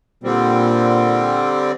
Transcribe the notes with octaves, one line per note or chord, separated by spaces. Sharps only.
A#2 D3 G3 C4